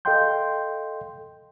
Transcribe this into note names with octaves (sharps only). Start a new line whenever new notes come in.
A4 D#5 F5 G5 C6 G6